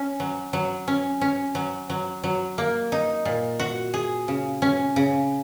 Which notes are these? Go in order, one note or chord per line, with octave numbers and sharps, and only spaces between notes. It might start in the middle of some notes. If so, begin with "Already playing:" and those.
Already playing: C#4
F#3
F#3
C#4
C#4
F#3
F#3
F#3
A#3
D#4
A#2
F#4
G#4
C#3
C#4
C#3